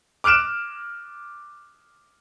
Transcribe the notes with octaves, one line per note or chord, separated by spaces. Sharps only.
D6 F6 F#6 D7 E7